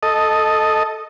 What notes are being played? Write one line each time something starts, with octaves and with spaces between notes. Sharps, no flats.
A4 D#5